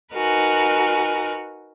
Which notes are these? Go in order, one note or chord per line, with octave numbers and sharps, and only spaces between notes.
D#4 F#4 A#4 B4 G#5